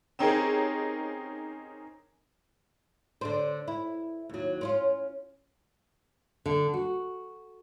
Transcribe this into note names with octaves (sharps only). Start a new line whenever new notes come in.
C4 C#4 D#4 G4 G#4 A#4
D3 D4 C5
E4
D#2 F#3
C4 C#4 F4
D3
F#4